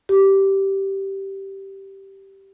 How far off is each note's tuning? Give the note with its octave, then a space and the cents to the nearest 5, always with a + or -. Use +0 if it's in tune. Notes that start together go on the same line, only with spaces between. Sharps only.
G4 -10